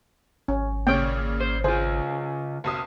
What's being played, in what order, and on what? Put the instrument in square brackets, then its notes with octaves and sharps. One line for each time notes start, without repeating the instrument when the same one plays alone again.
[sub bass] G#1 [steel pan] C#4
[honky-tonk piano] A#2 C#3 [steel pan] C#5 G5
[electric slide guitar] C5
[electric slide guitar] C#3 F4 [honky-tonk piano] G#4 [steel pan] C5
[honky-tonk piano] F#1 B1 D#6